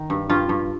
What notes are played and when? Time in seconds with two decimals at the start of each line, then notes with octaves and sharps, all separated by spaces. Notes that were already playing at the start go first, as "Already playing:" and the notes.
Already playing: D#3
0.10 G2
0.29 G2 F4
0.49 G2